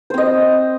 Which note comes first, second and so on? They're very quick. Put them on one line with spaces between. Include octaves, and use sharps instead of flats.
C5 C4 D#5